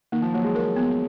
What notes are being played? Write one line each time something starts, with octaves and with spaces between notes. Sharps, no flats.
D#3 A#3
F3
F#3 A#3
G#3
A#4
B3